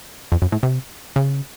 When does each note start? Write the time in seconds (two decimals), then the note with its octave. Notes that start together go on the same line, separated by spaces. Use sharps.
0.32 F2
0.42 F#2
0.52 A2
0.63 C3
1.16 C#3